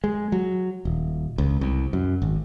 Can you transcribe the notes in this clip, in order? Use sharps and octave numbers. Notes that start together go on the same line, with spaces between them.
G#3
F#3
D#1
C#2
C2
F#2
G#1